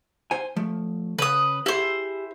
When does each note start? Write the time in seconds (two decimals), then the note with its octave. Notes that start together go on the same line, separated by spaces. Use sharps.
0.31 C5 G#5
0.56 F3 A3
1.19 C#3 B4 D#6
1.66 E4 G4 G#4 C5